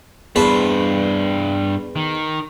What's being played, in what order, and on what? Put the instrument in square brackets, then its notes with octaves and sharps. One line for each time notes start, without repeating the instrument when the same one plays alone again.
[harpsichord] E2 B4 A5 [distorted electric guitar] G2 C5
[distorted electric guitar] D#3